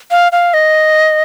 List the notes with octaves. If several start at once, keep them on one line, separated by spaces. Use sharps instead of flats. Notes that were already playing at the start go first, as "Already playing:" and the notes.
F5
F5
D#5